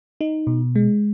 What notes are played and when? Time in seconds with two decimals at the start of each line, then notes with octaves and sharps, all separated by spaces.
0.21 D#4
0.47 B2
0.76 G#3